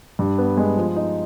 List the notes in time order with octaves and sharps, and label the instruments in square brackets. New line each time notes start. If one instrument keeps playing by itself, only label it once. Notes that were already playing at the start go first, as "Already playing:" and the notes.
[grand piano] G2
B3
G#3
F3
D#4